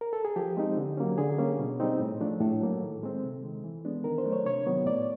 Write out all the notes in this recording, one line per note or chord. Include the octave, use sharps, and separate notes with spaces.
A#4
A4
G#4
F3 G4
G#3 C4 D#4
D3
F#3 A#3 C#4
D3 G#4
G3 A#3 C#4
B2
G3 C4 D#4
A2
F3 A3 D4
A2 A4
F#3 A#3
D#3
G#3 C4
C3
D#3 G#3
E3
G#3 B3 D4
D#3 A#4
C5
F#3 A3 D4
C#5
C3 C#5
D#3 F#3 B3
A2 D5